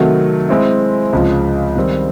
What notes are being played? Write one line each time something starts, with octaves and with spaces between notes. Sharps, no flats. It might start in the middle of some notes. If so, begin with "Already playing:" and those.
Already playing: C3 D#3 F#3 A3
G#3 C4 E4
C#2 C3 F3 G#3
D#3 G3 C4